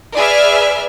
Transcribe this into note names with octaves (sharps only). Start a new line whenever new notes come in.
G#4 B4 D5 E5 F6